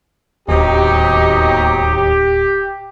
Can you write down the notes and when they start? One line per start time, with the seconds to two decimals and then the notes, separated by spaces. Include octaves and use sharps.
0.48 D1 D#2 C3 F#3 B3 D#4 G4